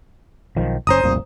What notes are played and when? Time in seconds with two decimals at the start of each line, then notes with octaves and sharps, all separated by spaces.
0.57 B1 D#3 F3
0.87 F#1 C#4 C5 A#5 D#6
1.04 F1 C2 A#2